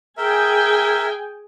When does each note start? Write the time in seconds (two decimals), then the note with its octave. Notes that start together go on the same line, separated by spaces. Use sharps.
0.17 G#4 A#4 E5 G5 G#5